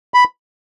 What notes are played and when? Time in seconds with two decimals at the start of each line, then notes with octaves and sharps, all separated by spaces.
0.14 B5